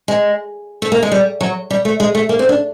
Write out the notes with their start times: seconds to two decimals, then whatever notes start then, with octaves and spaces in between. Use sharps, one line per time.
0.08 G#3
0.82 A3
0.92 A#3
1.03 G#3
1.12 G3
1.41 F#3
1.70 G3
1.85 A3
2.00 G#3
2.15 A3
2.29 A#3
2.39 C4
2.49 D4